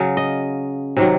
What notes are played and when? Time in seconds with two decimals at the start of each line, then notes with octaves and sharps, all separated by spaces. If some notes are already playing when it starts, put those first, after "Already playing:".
Already playing: C#3 F#3 F5
0.17 D#5
0.96 C3 D#3 F#3